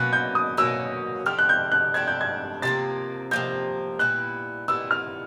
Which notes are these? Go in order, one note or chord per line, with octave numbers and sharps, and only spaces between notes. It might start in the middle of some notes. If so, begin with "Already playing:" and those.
Already playing: B2 F#3 A#3 C#4 F#6
G6
D#6
B2 F#3 A#3 C#4 E6
F3 A3 D4 G4 F6
F#6
G6
F#6
F3 A3 D4 G4 G#6
G6
G#6
C3 F3 A#3 A6
C3 F3 A#3 G6
A#2 G3 B3 E4 F#6
A#2 G3 B3 E4 E6
F6